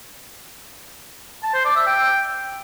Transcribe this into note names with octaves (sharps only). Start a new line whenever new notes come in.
A5
C5
D5
E5
G5